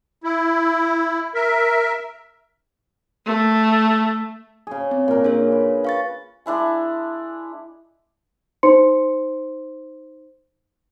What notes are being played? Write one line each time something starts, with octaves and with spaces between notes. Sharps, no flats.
E4
A#4 E5
A3
C#3 G#4
C4
A#2 A#4
D4 G#4 C#5
B4
F5 C#6 A6
G#3 D4 E4 G#5
D#4 C5 C6 C#7